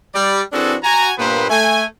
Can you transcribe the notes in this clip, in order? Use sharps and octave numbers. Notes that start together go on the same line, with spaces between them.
G3 D5
E3 C4 D4 F#4 G#4 A4
F#4 G#5 A#5
G2 A#2 A#3 B3 B4 C5
A3 G#5